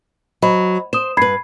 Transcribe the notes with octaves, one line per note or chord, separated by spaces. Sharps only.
F#3 C5 D#5 B5
C5 D#6 E7
G2 B4 B5 G#6 C7